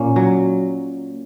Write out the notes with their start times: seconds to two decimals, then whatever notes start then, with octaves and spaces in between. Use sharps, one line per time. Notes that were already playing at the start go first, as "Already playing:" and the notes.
Already playing: A#2 A#3 C#4
0.16 F#3